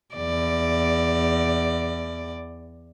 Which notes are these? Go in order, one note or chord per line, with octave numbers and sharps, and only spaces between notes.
E2 D5